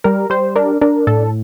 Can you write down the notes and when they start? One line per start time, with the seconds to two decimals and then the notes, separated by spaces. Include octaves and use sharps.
0.04 G3 A#4
0.30 G3 C5
0.56 D4 A#4
0.81 D4 A#4
1.07 A2 A4